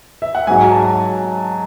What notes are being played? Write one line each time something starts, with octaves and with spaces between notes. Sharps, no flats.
E5
F#5
G#2 F#3 G#5
A5